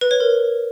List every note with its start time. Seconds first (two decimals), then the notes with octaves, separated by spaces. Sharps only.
0.01 B4
0.11 C#5
0.20 A#4